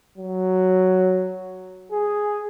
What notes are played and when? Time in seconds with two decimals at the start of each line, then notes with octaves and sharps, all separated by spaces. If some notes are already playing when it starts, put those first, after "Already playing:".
0.18 F#3
1.92 G#4